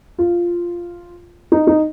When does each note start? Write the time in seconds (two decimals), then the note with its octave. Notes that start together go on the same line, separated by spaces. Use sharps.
0.18 F4
1.52 D#4
1.67 D#4